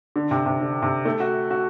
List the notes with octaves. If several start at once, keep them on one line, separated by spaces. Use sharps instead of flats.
D3
C3
C3
D3
C3
A3
F#4
F#4